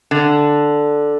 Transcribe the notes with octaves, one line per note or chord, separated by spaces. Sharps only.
D3